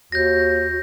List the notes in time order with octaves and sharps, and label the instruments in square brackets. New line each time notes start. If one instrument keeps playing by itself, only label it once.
[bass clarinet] D#2 [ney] F#4 [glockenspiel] G6 A#6